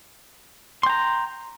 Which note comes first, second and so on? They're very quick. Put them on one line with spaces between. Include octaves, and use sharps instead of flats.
C6 G5 A#5